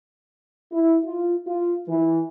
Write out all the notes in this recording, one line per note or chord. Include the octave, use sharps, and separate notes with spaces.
E4
F4
F4
E3